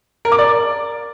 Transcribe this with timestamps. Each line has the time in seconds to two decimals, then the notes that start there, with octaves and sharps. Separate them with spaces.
0.25 A#4
0.32 D6
0.39 D5